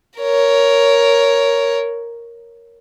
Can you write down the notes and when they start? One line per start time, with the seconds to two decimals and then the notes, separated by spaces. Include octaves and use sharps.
0.19 A#4 C#5